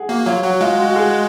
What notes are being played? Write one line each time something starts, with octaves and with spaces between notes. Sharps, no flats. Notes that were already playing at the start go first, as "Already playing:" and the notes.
Already playing: G#4 F#5
A#3 F#4
F#3 F4
F#3 F#4
G#3 F4
F#4
F#4
G#4